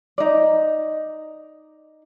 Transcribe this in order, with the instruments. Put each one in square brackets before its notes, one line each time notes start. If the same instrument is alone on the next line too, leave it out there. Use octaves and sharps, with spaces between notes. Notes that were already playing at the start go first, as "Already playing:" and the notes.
[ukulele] D#4 D5